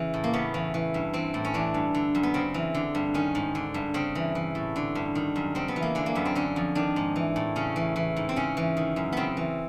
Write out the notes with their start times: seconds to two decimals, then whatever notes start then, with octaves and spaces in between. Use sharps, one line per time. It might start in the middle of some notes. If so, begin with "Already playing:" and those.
Already playing: C#3 E3
0.14 A2
0.24 A#3
0.33 C#3 B3
0.54 E3
0.74 E3
0.94 G2
1.14 E3 C4
1.34 A2
1.45 C#4
1.54 E3 D4
1.74 G2
1.95 D3
2.15 F#2
2.23 B3
2.34 C#3 C4
2.54 E3
2.74 D3
2.95 G2
3.14 D#3 C#4
3.35 G#2
3.55 D3
3.74 G2
3.94 C#3 C4
4.15 E3
4.35 E3
4.55 A2
4.76 D3
4.95 G2
5.15 D#3
5.36 F#2
5.55 C#3 C4
5.68 B3
5.76 E3
5.82 A#3
5.95 D3 G#3
6.06 A#3
6.15 F#2 B3
6.25 C4
6.35 D3 C#4
6.56 F2
6.75 D#3 D4
6.96 G#2
7.16 E3
7.36 A2
7.56 C#3 C#4
7.76 E3
7.96 E3
8.16 G#2
8.29 C4
8.36 C#3 C#4
8.57 E3
8.77 D#3
8.96 F#2
9.12 C#3 B3 C4
9.37 E3